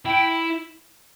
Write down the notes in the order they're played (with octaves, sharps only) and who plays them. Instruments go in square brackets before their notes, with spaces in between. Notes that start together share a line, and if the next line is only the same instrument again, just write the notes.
[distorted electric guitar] E4 [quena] G5